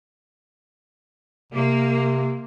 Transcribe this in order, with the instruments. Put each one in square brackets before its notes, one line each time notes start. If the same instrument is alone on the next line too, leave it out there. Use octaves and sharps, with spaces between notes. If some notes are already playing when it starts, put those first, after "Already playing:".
[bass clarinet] C3 [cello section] A#3